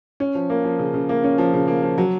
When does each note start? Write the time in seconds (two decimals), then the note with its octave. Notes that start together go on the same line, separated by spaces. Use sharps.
0.20 C#4
0.35 F3
0.50 A#3
0.65 F3
0.79 C#3
0.94 C#3
1.09 A#3
1.24 C#4
1.38 F3
1.53 C#3
1.68 A#3
1.83 F3
1.98 F#3